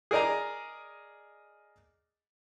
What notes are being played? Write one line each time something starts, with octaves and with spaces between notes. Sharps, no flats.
G#4 A#4 D5 D#5 A#5